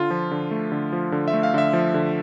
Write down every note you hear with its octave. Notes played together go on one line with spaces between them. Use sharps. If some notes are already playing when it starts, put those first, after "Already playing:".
Already playing: D3 F4
F3
D3
A3
D3
F3
D3
E5
A3
F5
D3 E5
F3
D3